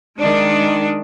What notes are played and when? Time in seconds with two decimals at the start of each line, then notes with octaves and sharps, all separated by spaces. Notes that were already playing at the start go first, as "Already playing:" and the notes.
0.18 D#3 G#3 D4